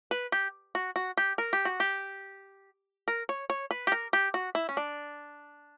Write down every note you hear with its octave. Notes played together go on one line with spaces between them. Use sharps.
B4
G4
F#4
F#4
G4
A#4
G4
F#4
G4
A#4
C#5
C#5
B4
G4
A#4
G4
F#4
E4
C#4
D4